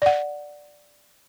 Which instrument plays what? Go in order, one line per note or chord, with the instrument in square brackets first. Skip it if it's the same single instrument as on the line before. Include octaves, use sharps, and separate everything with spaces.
[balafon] D5 F#5